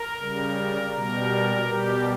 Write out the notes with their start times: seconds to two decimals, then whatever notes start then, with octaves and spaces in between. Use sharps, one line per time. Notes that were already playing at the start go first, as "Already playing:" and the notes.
Already playing: A#4
0.18 C#3 G3
0.92 B2 G3 A#4
1.67 B2 G3 G4